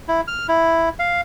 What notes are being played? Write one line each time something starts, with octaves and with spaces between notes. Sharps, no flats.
E4
F6
E4
F5